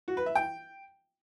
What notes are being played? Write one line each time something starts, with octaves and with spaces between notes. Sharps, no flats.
F#4
B4
E5
G5